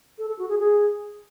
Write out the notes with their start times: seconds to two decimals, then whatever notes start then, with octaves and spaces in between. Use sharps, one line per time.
0.19 A4
0.29 A4
0.39 F#4
0.49 G#4
0.59 G#4